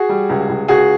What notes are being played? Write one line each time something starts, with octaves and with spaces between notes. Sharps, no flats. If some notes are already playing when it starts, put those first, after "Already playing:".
Already playing: F#4 G#4
G3
C#2
C#2
C#2 F#4 G#4